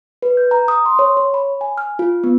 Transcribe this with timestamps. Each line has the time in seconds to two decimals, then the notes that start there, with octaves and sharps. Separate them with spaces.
0.22 B4
0.37 G6
0.51 A#5
0.68 D#6
0.86 C6
0.99 C#5
1.17 C#5
1.34 B5
1.61 G#5
1.78 F6
1.99 F4
2.24 B3